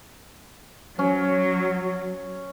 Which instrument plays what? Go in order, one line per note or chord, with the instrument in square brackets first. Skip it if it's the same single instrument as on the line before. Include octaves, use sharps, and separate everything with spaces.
[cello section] F#3 [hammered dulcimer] C#4